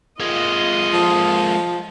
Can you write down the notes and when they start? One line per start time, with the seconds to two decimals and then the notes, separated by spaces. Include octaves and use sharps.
0.20 G#3 A#3 F4 D#5
0.93 F3